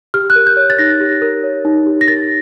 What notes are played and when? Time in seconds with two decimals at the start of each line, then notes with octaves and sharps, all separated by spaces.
0.14 G4 F6
0.30 F#6
0.36 A#4
0.47 G6
0.57 C#5
0.70 A6
0.79 D#4 A#6
1.00 G4
1.22 A#4
1.44 C#5
1.65 D#4
1.86 G4
2.01 A#6
2.08 A#4 A6